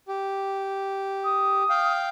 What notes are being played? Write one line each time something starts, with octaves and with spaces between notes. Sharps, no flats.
G4
D#6
F5 G5